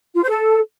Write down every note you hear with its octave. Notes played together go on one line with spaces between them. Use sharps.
F4
C5
A4